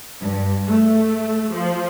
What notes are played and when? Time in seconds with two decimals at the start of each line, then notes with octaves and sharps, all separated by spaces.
0.21 G2
0.67 A3
1.54 F3